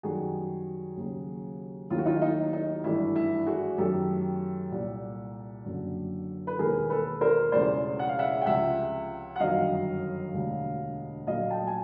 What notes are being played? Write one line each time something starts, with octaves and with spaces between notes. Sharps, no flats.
F#2 D#3 G3 F#4 G#4
D#2 C#3 F#3
D#2 D#3 F#3 A3 F4
F#4
D#4 F4
D#4
D#4
G#1 G2 E3 A3 E4
E4
F#4 G#4
F#2 D#3 F#3 A3 G4 A4
C2 A#2 G3
F#1 F#2 D3
B4
E1 D#2 D#3 G#4 A#4
A4 B4
A#4 C5
E1 E2 C#3 F3 A3 C5 D5
F#5
F5
E5 F#5
G5
C#2 C3 F3 E5 F#5
F#5
G1 F#2 D#3 F#3 D#5 F5
E1 D2 D3 G3
A#1 A#2 F#3 A3 D#5 F5
G5 A5
G#5